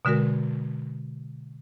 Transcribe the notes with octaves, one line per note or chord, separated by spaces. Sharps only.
B2 D3 G#3 F#4 A#4